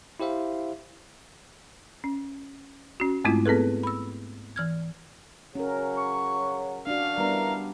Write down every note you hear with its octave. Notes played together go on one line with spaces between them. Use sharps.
E4 G4 C5 E5 F5
C#4
C#4 F#4
G#2 G#3 A3 C4 E4 F4
B3 C4 G#4 A4 B4
B5 E6
E3 F6 G#6
C#3 F#3 C#4 A#4
C#6
D4 F#4 D5 F5
E3 G3 B3 D4 A#4